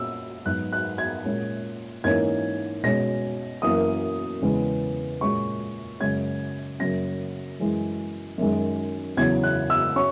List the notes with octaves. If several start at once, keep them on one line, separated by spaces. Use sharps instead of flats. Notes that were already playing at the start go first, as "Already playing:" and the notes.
Already playing: A#2 A#3 C#4 E6
G#2 F#3 B3 F#6
F#6
G#6
A#2 G#3 C#4
G#2 E3 A#3 C#4 G#6
B2 G#3 C#4 A#6
F#2 E3 A#3 D#6
E2 C#3 G#3 B3
A#2 G#3 C#4 C#6
F#2 C#3 G#3 C#4 G#6
F#2 C#3 F#3 A#3 C#4 A#6
F#2 E3 G#3
F#2 D#3 G#3
E2 C#3 F#3 C#4 G#6
F#6
E6
C#4 C#6